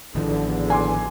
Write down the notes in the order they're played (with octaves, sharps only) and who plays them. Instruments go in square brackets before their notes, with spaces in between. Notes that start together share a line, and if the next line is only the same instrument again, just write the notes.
[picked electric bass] A1 D#3 F3 [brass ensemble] E2 D3
[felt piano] G#5 C6 D6